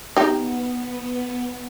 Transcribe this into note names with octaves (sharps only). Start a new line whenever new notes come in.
B3 D#4 G4